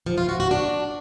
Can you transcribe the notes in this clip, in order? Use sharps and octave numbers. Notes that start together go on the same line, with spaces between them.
F3
F4
F#4
F#4
D4